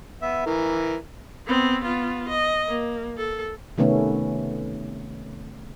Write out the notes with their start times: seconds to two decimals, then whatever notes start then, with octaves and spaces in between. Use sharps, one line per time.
0.22 B3 E5
0.46 E3 A#4
1.47 B3 C4
1.84 B3 F4
2.29 D#5
2.68 A#3
3.17 A4
3.78 C3 D#3 A3 B3 C#4